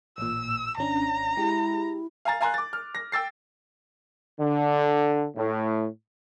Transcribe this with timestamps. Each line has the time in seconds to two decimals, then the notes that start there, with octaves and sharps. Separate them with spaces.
0.18 A1 A#2 E6
0.78 G#1 C#4 D4 A#5
1.37 G#3 E4 G4
2.25 F5 G#5 A#5 A6
2.41 F5 G#5 A#5 C6 F#6
2.54 D6 A6
2.73 F6
2.95 A#6
3.12 G5 E6 A6 C7
4.39 D3
5.36 A2